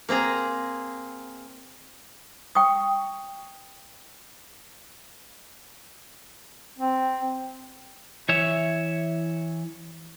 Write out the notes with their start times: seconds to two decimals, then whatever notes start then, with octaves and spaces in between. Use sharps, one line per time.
0.09 A#3 C4 G#4 A#5
2.55 G5 C#6 D#6
6.79 C4
8.29 E3 C#5 E5